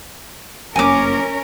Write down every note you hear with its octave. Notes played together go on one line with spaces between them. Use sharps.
F1 F#2 A#3 C#4 A#4 G#5 D6